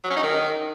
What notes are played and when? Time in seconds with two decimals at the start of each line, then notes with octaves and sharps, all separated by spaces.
0.04 F#3
0.10 C#4
0.17 D#4
0.23 D#3